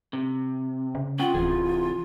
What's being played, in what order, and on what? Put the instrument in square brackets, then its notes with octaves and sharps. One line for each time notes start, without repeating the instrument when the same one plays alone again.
[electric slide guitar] C3
[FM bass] C#3
[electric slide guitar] C#4 F#5 G5 [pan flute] F4
[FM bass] D1 [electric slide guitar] C3 E3 G#4